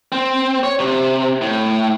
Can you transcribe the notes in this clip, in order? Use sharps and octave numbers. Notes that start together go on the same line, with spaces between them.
C4
C#5
C3
A2